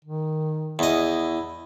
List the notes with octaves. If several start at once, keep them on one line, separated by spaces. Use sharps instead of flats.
D#3
E2 E4 D#5